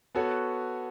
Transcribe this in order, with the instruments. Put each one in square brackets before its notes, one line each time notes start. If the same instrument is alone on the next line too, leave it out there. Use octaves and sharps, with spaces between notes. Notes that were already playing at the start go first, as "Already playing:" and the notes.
[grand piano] B3 F#4 A4 C#5